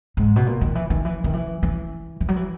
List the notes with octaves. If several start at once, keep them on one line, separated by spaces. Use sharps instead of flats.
G#2
B2
A#2
D#3
E3
D#3
E3
D#3
E3
E3
E3
F#3
E3